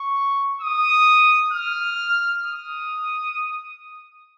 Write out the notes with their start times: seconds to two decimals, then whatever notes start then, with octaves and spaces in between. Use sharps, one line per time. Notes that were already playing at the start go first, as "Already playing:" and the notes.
Already playing: C#6
0.61 D#6
1.52 F6
2.44 D#6